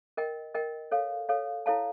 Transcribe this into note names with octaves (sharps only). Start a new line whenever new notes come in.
A#4 D#5 G5
A#4 D#5 G5
A4 C#5 F5
A4 C#5 F5
E4 A4 C#5 F5 A5